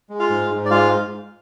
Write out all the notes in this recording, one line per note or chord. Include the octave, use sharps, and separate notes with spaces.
G#3
F4 F5
G#2
G#2
D5
G#3 F4 F5